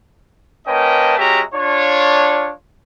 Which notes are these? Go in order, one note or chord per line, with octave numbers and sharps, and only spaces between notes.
A#3 C#4 B4 D#5 G5 A5
G#3 C#4 F#4 G4 E5 A#5
D4 F4 C#5